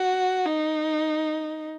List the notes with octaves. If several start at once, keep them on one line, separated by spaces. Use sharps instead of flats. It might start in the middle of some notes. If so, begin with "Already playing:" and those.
Already playing: F#4
D#4